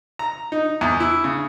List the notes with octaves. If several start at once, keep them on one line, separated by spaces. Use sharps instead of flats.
A#5
D#4
E2
E4
C#3